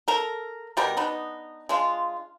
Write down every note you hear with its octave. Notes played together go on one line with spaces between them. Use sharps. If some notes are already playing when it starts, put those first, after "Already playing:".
A4 A#4
B2 G3 G4 A#4
B3 D4 D#4
G#3 D4 F4